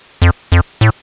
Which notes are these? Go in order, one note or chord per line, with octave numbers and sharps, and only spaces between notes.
F2
F2
A2